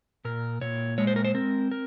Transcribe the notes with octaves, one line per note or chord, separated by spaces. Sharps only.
A#2 A#4
A#2 C#5
G#3 C#5
C5
A#4
C5
C4 A#4
A#4